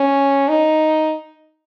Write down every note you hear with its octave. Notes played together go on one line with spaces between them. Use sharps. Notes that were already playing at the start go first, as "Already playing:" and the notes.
Already playing: C#4
D#4